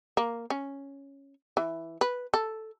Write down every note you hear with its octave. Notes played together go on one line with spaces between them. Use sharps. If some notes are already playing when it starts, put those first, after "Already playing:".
A#3
C#4
E3
B4
A4